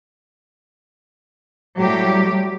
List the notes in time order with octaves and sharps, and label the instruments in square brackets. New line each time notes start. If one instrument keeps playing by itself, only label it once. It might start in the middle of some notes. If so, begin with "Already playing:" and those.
[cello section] A2 F#3 G3 G4